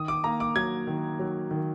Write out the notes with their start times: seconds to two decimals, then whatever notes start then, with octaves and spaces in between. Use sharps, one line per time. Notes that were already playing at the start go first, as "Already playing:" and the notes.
Already playing: D#3 D#6
0.08 D6
0.24 A#3 A#5
0.40 D6
0.56 F#3 G#6
0.87 D#3
1.20 F#3
1.51 D#3